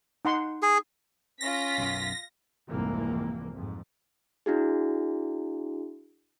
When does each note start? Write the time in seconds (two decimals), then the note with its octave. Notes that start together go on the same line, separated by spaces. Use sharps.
0.25 D#4 F#5 C6
0.62 G#4
1.41 C#4 F4 A#6 B6
1.78 B1 F#2
2.68 F1 C2 G#2 E3 A#3
3.52 F2 G#2
4.46 D4 E4 F#4 G#4